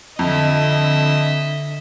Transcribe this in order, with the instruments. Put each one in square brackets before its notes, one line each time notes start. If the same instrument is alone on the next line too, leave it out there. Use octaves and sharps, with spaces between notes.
[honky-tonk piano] F2 [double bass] D3 [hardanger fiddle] D#5 E5